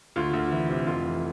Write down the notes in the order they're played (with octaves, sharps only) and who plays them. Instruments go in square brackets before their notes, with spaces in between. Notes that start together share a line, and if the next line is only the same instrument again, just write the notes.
[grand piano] D2 F4
D2
E3
C3
F1 F4
E3